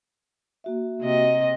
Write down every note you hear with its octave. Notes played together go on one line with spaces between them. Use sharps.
A#3 F#4 E5
C3 D#5